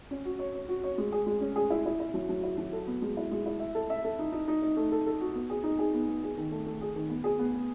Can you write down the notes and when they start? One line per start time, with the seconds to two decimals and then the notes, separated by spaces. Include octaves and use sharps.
0.11 C#4
0.25 F#4
0.39 C#5
0.54 C#5
0.68 F#4
0.84 C#5
0.98 G#3
1.12 G#4
1.26 G#3
1.41 C#4
1.56 G#4
1.70 E4
1.86 E4
2.00 E4
2.14 F#3
2.29 F#3
2.43 E4
2.58 F#3
2.73 A4
2.87 B3
3.02 G#3
3.17 E4
3.31 G#3
3.46 E4
3.60 E5
3.75 A4
3.90 E5
4.04 A4
4.19 D#4
4.32 D#4
4.48 D#4
4.62 D#4
4.77 A3
4.92 A4
5.07 A4
5.21 F#4
5.35 B3
5.50 G#4
5.64 D#4
5.79 G#4
5.94 B3
6.08 B3
6.23 G#4
6.37 D#3
6.51 A3
6.66 A3
6.81 G#4
6.96 D#3
7.09 B3
7.24 G#4
7.39 B3
7.54 B3